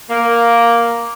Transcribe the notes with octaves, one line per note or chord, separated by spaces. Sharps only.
A#3